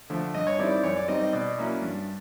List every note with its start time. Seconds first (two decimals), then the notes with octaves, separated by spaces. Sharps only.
0.10 D3 F3 A3
0.34 G2 D#5
0.47 C#5
0.59 D#3 G3 C4 E4 D5
0.71 D5
0.83 F#2 C#5
0.96 D5
1.08 D#3 G3 C4 D#4 D#5
1.21 D#5
1.33 B2 D5
1.57 F#3 A#3 C#4 E4
1.82 G2